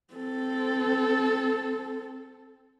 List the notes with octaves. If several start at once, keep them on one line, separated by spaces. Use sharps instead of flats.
C4 A4